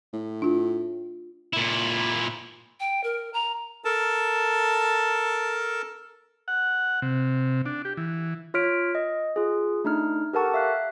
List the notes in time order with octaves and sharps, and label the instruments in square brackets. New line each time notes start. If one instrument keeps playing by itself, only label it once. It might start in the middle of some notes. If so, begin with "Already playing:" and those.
[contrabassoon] A2
[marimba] D4 F4
[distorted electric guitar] A#2 E4
[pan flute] G5
A#4
A#5
[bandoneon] A4 A#4 A5
[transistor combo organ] F#5
C3
D4
G4
E3
[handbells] F4 C#5 F6 B6 D7
D#5
F4 G#4
A3 D4 D#4 F6
G4 A4 A#4 F#5 A5 C#6
E5 F5 F#6